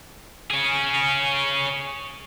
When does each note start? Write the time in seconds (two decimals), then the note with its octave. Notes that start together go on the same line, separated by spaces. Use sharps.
0.50 C#4 G#4